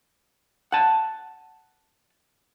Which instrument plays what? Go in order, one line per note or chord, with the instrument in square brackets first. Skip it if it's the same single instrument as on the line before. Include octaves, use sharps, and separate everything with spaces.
[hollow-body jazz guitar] F#5 A5